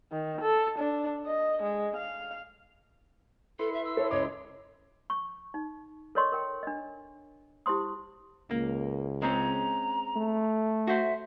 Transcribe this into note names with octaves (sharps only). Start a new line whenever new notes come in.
D#3
A4
D4
D#5
G#3
F5
E4 A4 B4 C6
E5
E6
A4 C#5 E5
C#2 C#5 D#5 D6
C#6
D#4
A4 A#4 C#5 D#5 C6 C#6
A#4 G5
D4 D#5
E4 G4 C5 C6 D#6
C#2 A#3
G#3 C4 C#4 A#5
A3
F#4 C5 E5